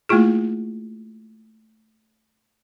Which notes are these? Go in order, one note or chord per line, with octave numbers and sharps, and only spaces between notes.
A3 A#3 E4 F4 G#4